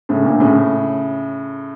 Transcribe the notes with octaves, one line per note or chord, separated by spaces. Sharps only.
A2 C#3
A#2 D3
A2 C#3